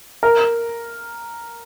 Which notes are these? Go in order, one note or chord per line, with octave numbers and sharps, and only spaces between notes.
A#4